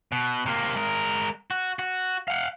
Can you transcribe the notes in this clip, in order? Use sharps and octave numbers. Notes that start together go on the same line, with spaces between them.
B2
C3 A#3
G#3 A#4
F#4
F#4
F5 F#5